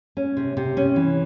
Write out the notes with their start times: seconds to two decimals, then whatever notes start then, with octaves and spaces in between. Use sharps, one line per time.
0.17 C#4
0.37 C3
0.57 C3
0.77 C#4
0.96 E3